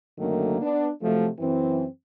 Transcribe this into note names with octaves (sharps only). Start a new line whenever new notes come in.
F#2 D3 D#3 F#3 A3 A#3
B3 D4
C3 F3 F#3 A3
F#2 E3 C4